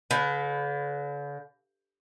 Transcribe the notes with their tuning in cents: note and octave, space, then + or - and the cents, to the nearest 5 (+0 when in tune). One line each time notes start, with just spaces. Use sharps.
D3 -45 B4 +15